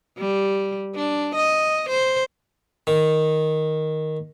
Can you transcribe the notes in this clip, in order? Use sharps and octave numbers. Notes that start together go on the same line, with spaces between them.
G3
D4
D#5
C5
D#3